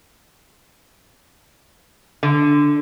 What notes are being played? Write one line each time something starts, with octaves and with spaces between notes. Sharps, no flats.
D3